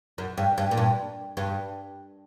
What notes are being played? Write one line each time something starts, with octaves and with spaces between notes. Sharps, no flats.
F#2
G2
G2
A#2
G2
G2